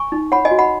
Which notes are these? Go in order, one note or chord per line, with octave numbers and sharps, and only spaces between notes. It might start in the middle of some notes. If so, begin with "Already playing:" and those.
Already playing: G#5 C#6
D#4
C#5 F#5 B5
D#5 G#5
F#4
F#5 B5